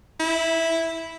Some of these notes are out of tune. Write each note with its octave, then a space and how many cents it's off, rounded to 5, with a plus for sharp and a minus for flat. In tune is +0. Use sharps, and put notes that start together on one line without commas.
E4 -5